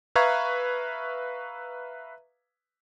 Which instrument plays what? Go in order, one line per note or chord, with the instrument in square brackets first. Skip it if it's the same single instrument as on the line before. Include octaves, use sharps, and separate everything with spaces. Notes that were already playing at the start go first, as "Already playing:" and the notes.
[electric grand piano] B4 E5 F5 A#5 C#6 G#6